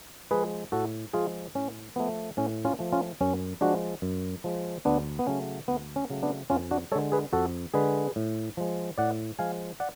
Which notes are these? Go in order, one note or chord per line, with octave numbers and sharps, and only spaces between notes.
F3 G#3 G#4 B4
A2 F#4 A4
F3 G#3 F4 G#4
A2 C#4
F3 A3 B3
A2 C#4
C#4 F4
F3 A3
C#4 F4
F#2 C#4
F3 G#3 D4 F#4
F#2
F3 G#3
D2 B3 D4
B3
C#3 F#3 A3 C#4
D2 B3
C#4
C#3 F#3 A3
B3 D4
F2 C#4 F4
D4 F#4
D3 G#3 A4 C#5
G#4 B4
F2 F#4 A4
D3 G#3 G#4 B4
A2
F3 G#3
A2 D5 F#5
F3 G#3 F5 G#5
D5 F#5